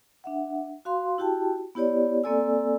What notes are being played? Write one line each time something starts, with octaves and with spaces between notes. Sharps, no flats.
D4 E5 F#5
F#4 F5 C6
E4 F#4 G4 G5 A5
B3 E4 G4 C#5 D5
A#3 C4 A4 D5 G#5 E6